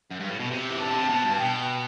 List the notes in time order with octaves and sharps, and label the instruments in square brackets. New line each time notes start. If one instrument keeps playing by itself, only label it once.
[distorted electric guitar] F#2
G2
A2
B2
C3
E3
[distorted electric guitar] D3 [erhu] A5
[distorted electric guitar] C3
B2
G2
[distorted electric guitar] B2 [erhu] G5